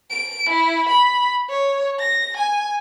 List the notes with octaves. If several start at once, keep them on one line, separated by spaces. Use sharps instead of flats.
D7
E4
B5
C#5
A#6
G#5